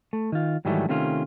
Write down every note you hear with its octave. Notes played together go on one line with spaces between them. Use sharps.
A3
D#3 F4
G#2 D#3 E3 F#3 G3 A3
C3 D#3 A3 C#4 F4